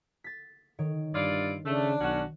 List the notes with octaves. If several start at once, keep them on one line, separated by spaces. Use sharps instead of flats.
A6 B6
D#3 C#5 D7
G2 E4 F4 D5
C#3 A3 D4
B1 C#4 F#4